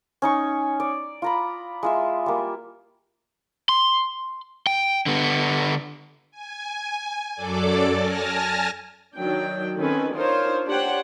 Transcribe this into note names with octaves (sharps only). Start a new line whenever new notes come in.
C#4 D#4 C#6
D5
F4 A#5 B5
G#3 F4 E5
G3 A#3
C6
G5
D3 B3
G#5
F#2 F#3 A4 D5 D6
G#5 A5 F6 A#6
D#3 F#3 D4 G5
D#3 C4 C#4 A4 B4 G#5
D4 D#4 F4 A#4 C5 C#5
D4 G4 C5 C#5 F#5 G5